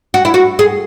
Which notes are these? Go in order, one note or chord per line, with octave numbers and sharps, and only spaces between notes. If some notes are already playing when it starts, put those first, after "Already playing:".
F#4
E4
F#4
G#4